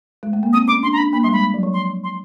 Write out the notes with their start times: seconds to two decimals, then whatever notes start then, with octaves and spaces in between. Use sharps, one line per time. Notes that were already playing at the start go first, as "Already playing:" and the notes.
0.23 G#3
0.33 A3
0.43 A#3
0.53 C4 D#6
0.68 C#4 D6
0.83 D4 C6
0.93 A#5
0.98 D4 B5
1.13 A#3 B5
1.23 G3 C6
1.29 G#3 B5
1.54 F#3
1.63 F3
1.73 C6
2.04 C6